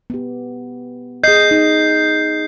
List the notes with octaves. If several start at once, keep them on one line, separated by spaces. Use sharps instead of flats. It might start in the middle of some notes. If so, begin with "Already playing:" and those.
B3 G4
G#4 D#5 G6 C7
D#4